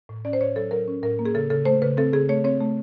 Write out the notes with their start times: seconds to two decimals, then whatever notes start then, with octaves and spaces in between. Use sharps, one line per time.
0.09 A2
0.25 C#4 D5
0.33 C5
0.40 A2 C#5
0.56 F#3 A4
0.71 F#3 A#4
0.88 C#4
1.03 A2 A#4
1.19 A#3
1.25 G#4
1.34 C#3 A4
1.50 C#3 A4
1.65 A3 C5
1.82 C#3 B4
1.97 C4 A4
2.13 C#3 G#4
2.29 A3 C#5
2.44 C4 C#5
2.60 A3